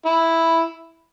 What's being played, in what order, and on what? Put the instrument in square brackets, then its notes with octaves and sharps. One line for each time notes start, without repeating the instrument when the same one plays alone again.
[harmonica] E4